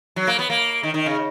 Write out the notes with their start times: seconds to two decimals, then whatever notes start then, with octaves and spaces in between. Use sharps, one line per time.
0.16 F#3
0.27 A#3
0.39 B3
0.50 A#3
0.83 D#3
0.94 D#3
1.06 C#3